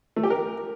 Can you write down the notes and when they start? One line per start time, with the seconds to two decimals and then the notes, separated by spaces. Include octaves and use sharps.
0.16 A3
0.23 G4
0.30 A#4